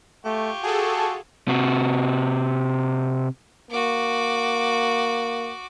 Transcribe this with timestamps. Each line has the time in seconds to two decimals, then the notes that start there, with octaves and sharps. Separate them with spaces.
0.25 A3 F4 G4 C#6
0.63 F#4 G#4 A4 A5
1.48 C3 F#4
3.71 A#3 F#4 D6